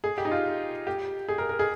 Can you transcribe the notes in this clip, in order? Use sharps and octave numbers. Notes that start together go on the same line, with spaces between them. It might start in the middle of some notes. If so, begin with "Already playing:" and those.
G#4
G4
D#4
F4
G4
G#4
A#4
A#4
G#4